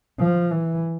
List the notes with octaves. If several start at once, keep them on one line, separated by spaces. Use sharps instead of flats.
F3
E3